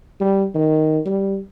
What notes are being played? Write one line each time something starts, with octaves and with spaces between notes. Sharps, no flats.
G3
D#3
G3